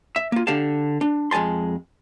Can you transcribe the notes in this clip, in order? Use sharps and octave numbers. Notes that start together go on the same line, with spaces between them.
E5
A#3 F4
D3 G4 F5 A5
D4
F2 G#3 G#5 A5 C6